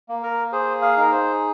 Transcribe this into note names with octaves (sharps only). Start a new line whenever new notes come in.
A#3
A#4
G#4 C5
F5
D#4 A#4
C5